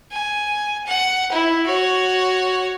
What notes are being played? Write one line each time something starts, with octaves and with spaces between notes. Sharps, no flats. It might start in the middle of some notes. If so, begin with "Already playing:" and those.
G#5
F#5
E4
F#4 C#5